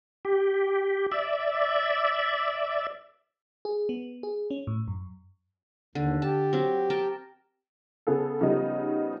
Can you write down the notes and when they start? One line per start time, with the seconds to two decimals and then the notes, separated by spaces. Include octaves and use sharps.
0.25 G4
1.12 D5 E5
3.65 G#4
3.89 B3
4.23 G#4
4.50 C#4
4.67 A2
4.88 F#2
5.95 D#2 D3
6.22 G4 A5
6.53 F#3 C4
6.90 A#4 G5 A5
8.07 C#3 B3 G#4 A4
8.41 C#3 F3 G3 B3 D#4